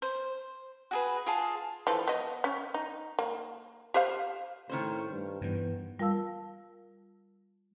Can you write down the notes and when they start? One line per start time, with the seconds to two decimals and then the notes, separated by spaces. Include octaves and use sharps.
0.02 C5
0.91 F#4 G#4 B4
1.26 F4 G#4 A5
1.87 E3 F3 A4
2.08 B3 D#5
2.44 C#4
2.74 D#4
3.19 A#3
3.94 G4 C5 F5
4.69 A2 D#3 C#4 C5
5.11 G2
5.41 G2 E3 B3
5.99 G3 F4 A#4 F5 A5 E6